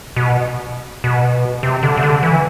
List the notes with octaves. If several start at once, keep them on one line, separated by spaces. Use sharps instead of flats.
B2
B2
C3
D3
C3
D3
E3